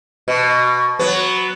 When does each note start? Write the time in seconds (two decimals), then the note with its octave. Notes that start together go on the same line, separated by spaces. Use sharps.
0.28 B2
0.99 F#3 B3